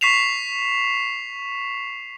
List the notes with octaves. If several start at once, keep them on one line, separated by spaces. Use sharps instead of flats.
C#6 B6 C7 E7 F7